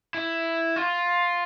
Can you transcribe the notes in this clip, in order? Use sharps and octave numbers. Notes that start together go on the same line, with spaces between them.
E4
F4